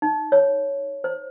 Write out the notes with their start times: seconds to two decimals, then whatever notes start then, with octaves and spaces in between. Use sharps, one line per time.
0.02 D#4
0.32 C#5
1.04 C5